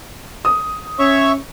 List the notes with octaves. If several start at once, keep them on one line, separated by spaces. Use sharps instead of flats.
D#6
C#4 C#5 E5 C#6